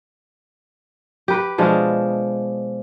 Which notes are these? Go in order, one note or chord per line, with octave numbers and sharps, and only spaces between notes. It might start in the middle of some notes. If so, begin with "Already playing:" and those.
G4 B4
B2 F3 G#3 D4